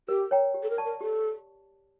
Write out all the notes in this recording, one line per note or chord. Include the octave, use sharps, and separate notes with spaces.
G4 A#4
C#5 G5 A#5
G4
A4
A#4
D5 A5 C#6
A#4
G4 A4